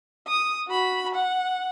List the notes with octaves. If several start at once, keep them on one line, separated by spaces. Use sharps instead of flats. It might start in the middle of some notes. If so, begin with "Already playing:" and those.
D#6
F#4 B5
F#5